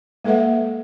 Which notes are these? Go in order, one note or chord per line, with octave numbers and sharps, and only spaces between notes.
G#3 A#3 A4 B4 E5 F#5